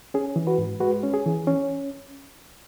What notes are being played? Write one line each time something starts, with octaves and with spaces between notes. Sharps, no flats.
C#4 G#4
E3
F#4 B4
G#2
G#3 F#4 B4
C#4
G#4
E3
C#4